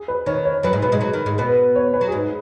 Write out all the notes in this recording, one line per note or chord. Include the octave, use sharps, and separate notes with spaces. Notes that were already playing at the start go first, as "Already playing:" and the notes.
Already playing: G#4
B4
D#3 C#5
C#5
F#2 F#3 B4
G#2 G#3
B2 B3 B4
G#2 G#3
F#2 F#3
D#3
G#2 G#3
B2 B3 B4
C#5
B4
F#3
G#4
G#2 G#3 B4